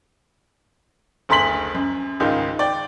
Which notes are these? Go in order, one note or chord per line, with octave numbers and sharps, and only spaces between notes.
F#1 D2 A#5 C6 B6 F#7
F#2
C#2 G#2 D#3 D#4 F4
D5 G5